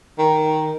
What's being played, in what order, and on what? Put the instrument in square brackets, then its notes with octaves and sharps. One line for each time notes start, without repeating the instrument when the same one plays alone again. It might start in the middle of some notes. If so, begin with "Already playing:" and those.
[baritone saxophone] D#3